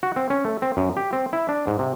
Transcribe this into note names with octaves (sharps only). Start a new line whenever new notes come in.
F#4
C4
C#4
A3
C4
F#2
G4
C4
E4
D4
G#2
C3